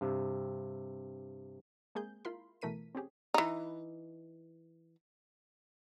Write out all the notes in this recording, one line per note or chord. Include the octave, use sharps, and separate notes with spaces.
G2 C3
G#3 A#3 C4 G#4 G6
E4 F4 A#4 B5 C6
B2 E3 A3 A#4 B6 D#7
C4 C#4 G4 G#4
E3 D#4